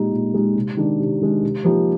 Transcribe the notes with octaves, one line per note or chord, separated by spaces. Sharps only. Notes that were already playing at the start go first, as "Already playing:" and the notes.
Already playing: A#2 G#3 D#4 G4
A#2
G#3 D#4 G4
C3
D#3 G#3 D4
C3
D#3 G#3 D4
C3
F3 A#3 D#4 G4